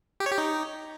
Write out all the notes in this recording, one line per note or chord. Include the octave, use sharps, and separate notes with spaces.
G4
C#5
G4
D#4